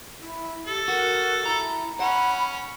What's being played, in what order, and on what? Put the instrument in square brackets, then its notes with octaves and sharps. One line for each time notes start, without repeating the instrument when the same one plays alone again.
[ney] E4
[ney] G4 [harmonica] A4
[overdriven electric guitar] F#4 [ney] A#4
[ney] E4 [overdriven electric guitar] A#5
[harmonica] C#4 [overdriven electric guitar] F#5 [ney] B5